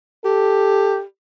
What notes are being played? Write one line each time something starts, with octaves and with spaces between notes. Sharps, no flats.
G4 A4